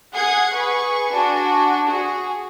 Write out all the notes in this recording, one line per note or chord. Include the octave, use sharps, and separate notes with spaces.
G#4 F#5 G#5 F#6 G#6 C7
G#4 B4 C#6
D4 F#4 G#5
F#4 G#4